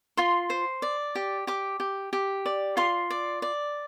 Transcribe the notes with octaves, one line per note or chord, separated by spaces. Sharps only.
F4 C6
C5
D5
G4
G4 D6
G4
G4
D5
F4 C6
D5
D5